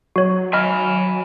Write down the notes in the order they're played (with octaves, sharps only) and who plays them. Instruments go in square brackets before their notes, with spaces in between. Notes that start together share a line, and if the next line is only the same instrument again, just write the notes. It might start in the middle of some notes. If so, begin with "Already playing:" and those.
[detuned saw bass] F#3 [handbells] F#4 C#5
[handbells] D#5 F6 [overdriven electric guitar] G#5 B5